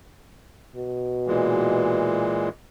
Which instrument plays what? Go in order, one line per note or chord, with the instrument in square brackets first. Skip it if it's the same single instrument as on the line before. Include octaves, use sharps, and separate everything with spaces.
[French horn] B2
[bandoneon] A#2 E3 G#3